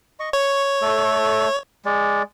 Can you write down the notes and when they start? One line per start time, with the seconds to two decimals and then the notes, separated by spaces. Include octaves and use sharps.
0.20 D#5 C#6
0.33 C#5 C#6
0.82 A3 A4
1.85 G#3 D5